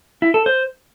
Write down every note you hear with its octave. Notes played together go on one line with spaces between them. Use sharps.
E4
A4
C5